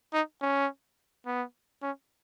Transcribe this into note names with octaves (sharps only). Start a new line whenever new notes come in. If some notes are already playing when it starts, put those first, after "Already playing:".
D#4
C#4
B3
C#4